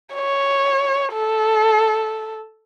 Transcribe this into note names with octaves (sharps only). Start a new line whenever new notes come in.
C#5
A4